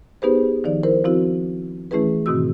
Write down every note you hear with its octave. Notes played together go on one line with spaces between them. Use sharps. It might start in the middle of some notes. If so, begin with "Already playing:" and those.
B3 D#4 G4 G#4 B4 C5
D#3 F3 D#4 D5
E4 A#4 C5
F3 C4 E4 F#4
E3 A3 C#4 E4 G#4 B4
G#2 B2 D#3 C4 F#4 E6